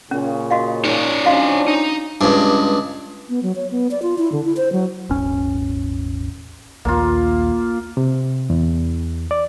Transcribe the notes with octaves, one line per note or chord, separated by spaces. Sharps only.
A#2 C#3 C#4
F#4 D#5 F5
D#4 C#5 D5
F3 C#4 D4 F#4 D#5 F5
D#4
C#2 G2
B3
F#3
C#5
B3
D5
F4
E4
D3
E4
C5
F#3
E1 A1 C#4
A#1 D#2 A#3 F4
C3
E2
D5